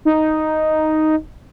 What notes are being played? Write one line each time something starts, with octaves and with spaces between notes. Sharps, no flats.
D#4